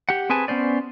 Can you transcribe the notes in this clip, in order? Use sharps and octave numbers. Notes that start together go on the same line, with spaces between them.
G4 F#5
C4 G#4 B4 G#5 A5
B3 C#4 C5 D5